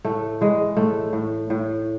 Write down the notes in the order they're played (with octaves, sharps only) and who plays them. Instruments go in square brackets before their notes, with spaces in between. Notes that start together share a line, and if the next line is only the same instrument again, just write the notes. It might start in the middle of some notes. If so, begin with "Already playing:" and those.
[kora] A2 A3
E3 G#3
A2 A3
A2
A2